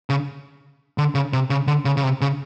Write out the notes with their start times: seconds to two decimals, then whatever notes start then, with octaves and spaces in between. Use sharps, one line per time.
0.10 C#3
0.98 D3
1.15 C#3
1.33 C3
1.50 C#3
1.67 D3
1.85 C#3
1.97 C#3
2.03 C3
2.21 C#3